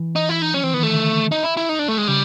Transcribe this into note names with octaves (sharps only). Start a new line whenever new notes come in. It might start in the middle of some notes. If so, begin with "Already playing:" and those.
Already playing: E3
D#4
E4
D#4
F3 C#4
E3 C4
D#3 B3
E3 A3
D3
D#4
E4
E4
D#4
D4
A3
G#3
C#3 G3